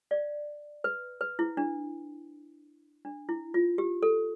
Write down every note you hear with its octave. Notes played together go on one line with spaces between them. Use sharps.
D5 F5
B4
B4
E4
D4
D4
E4
F4
G4
A4